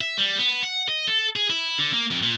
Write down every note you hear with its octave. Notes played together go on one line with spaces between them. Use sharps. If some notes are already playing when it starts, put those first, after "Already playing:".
E5
G3
B3
F#5
D#5
A4
G#4
E4
D3
A#3
F2
A#2